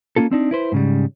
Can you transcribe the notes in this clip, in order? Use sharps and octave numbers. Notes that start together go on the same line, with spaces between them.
A#3 C4 C#4 F4 A4
C4 D4 D#4
E4 B4 C5
G#2 C#3 G3